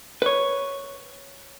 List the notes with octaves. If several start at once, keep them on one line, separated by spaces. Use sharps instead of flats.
B4 C#5